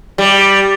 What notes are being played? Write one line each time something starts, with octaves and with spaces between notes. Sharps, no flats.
G3